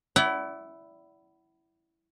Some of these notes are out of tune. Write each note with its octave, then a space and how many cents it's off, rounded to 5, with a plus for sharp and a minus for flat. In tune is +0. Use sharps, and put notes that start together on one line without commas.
E4 +0 D5 -25 F#5 +35